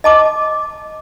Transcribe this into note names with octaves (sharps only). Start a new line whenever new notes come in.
D#5 A5 D6